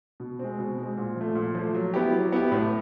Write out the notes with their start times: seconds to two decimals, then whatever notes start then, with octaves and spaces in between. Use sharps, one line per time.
0.20 B2
0.39 G#3 C4
0.59 B2
0.78 G#3 C4
0.97 A#2
1.16 F3 A3
1.35 A#2
1.55 F3 A3
1.75 F#3
1.94 B3 E4 G4
2.12 F#3
2.32 B3 E4 G4
2.52 A2